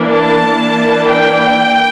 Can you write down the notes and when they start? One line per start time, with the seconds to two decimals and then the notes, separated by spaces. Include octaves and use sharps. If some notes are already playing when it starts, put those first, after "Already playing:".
Already playing: E3 A#3 D4
0.11 A5
0.44 E3 A#3 D4
1.10 G5